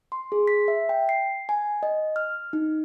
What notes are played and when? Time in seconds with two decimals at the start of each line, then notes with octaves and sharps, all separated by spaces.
0.12 C6
0.32 G#4
0.48 B6
0.68 E5
0.89 G5
1.09 C7
1.49 G#5
1.83 D#5
2.16 F6
2.53 D#4